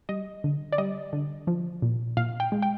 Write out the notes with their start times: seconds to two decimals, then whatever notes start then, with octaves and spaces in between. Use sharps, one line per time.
0.09 G3 D#5
0.44 D3
0.73 D5
0.78 G3 D#5
1.13 D3
1.47 F3
1.82 A#2
2.17 A#2 F5
2.40 G5
2.52 G#3
2.62 G5